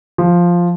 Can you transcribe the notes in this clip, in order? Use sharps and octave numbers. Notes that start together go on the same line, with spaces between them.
F3